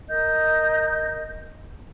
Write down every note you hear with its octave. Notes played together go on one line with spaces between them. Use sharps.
A#4 D#5 G6